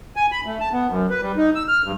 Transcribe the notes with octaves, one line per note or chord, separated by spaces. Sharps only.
G#5
B5
A3
A5
B3
F#2
B4
G3
D#4
E6
F6
G2